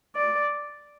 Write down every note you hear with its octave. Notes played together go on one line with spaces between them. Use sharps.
D5